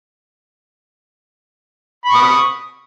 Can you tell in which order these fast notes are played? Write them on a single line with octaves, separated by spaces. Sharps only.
B5 C#6 D#6